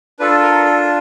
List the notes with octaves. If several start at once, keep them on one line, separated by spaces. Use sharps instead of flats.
D4 F4 A4 B4
A#4
A4